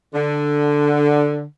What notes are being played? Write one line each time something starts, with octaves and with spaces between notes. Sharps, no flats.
D3